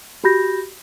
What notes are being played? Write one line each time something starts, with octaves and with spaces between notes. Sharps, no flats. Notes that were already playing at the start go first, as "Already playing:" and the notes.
F#4 G4 B5 G6 A#6